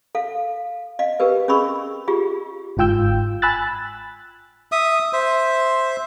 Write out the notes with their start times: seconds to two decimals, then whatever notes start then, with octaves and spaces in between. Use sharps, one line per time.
0.15 A4 F5
0.99 D#5 F5
1.20 G4 A#4 B4
1.48 C#4 G#4 D#5 B5 C#6 E6
2.08 F4 G4 G#4
2.77 G1 G#2 F4 G5 E6 G6
3.42 G#5 B5 E6 F#6 A6
4.72 E5 D#6
5.13 C5 E5